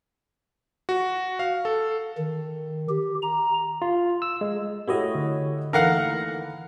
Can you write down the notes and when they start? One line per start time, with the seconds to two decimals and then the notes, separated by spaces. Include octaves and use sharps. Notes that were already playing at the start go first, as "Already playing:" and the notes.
0.89 F#4
1.39 F5
1.65 A4
2.18 D#3
2.89 G4
3.22 A#5
3.82 F4
4.22 E6
4.41 G#3
4.88 A3 E4 F#4 G4 C#5 D#5
5.15 D3
5.73 D#3 E3 A3 A#3 A#4 F5 F#5